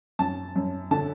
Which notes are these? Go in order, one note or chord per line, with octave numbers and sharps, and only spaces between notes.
F#2 A5
F#2
D3 A5